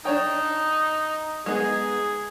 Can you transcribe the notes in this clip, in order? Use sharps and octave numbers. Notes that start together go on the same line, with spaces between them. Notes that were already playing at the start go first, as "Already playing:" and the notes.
D4 D#4 C#5 G5
G#3 B3 D#4 G#4